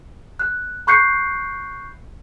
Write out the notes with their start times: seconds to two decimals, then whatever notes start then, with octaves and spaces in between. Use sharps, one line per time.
0.39 F#6
0.87 B5 C#6 F#6 G6 C7 C#7